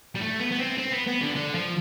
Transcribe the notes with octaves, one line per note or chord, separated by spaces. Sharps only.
G3
A3
B3
B3
C4
C4
B3
B3
D3
D3
F3